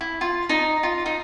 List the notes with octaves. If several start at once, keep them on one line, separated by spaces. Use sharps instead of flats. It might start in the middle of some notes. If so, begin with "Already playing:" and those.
E4
F4
D#4
F4
D#4